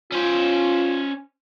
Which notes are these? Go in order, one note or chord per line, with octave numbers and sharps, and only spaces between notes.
C#4 F4 C5